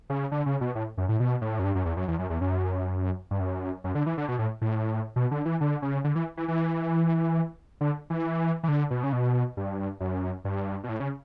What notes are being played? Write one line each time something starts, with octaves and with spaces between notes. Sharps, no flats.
C#3
D3
C#3
B2
A2
F#2
A2
B2
A2
F#2
G2
F#2
E2
F#2
E2
F#2
E2
F#2
G2
F#2
F#2
D3
E3
D3
B2
A2
A2
B2
D3
E3
D3
C#3
D3
E3
E3
E3
D3
E3
E3
D3
B2
C#3
B2
G2
F#2
G2
B2
A2
C#3